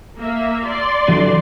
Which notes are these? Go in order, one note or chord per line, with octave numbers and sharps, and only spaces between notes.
A#3 E5
D5 C6
D3 E3 F#3